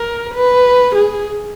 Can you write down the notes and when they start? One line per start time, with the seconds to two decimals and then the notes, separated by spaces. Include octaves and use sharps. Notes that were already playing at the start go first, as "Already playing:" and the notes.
Already playing: A#4
0.34 B4
0.96 G#4